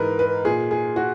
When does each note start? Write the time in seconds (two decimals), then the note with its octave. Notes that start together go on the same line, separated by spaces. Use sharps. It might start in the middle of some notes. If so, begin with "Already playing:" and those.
Already playing: G#2 E3 A#4 B4
0.19 B4
0.45 A#2 G#4
0.71 G#4
0.96 F#4